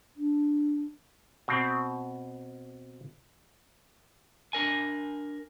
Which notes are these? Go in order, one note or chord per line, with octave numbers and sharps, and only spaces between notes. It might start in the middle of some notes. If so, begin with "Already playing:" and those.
D4
B2 C4
D4 A#4 G#5